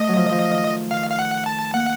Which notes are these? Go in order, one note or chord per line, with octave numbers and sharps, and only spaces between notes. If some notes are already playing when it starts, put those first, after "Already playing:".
Already playing: A3 D#5
F#3
F3
D#3
F3
D#3
D#3 F5
F5
F#5
A5
A#3 F#5